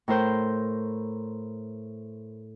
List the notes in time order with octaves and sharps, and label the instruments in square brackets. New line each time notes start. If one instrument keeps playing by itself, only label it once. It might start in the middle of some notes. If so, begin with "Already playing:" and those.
[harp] A2 A#4 C5 G6